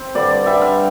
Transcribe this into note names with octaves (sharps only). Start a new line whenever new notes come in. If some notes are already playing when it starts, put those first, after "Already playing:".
Already playing: C4 C5
G2 D3 G3 D5
G2 D3 G3 E5
F5